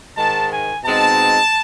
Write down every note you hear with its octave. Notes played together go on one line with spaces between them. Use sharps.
G#2 D#3 G#3 A5
G#5
B2 G#3 C4 D#4 A5